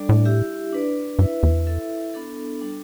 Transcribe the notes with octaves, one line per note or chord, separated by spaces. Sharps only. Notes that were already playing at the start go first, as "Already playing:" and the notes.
Already playing: G3 D4 A4 D5
A2
E4 G4 E5
D4 B4 D5
G2 E4 B4 E5
E2
E4 A4 E5
B3 D4 A4
G3 D4 A4